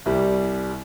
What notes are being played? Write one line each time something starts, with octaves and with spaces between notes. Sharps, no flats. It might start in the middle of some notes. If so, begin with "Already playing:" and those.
C2 G3